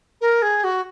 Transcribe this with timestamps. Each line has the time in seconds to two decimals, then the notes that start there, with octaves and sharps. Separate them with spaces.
0.21 A#4
0.42 G#4
0.64 F#4